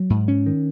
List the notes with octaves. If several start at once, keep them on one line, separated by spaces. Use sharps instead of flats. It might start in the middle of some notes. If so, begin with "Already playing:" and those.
Already playing: F#3
G#2
C#4
D#3